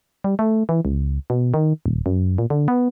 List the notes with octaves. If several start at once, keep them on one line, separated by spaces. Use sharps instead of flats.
G3
A3
E3
C#2
B2
D#3
D#1
F#2
A#2
D3
B3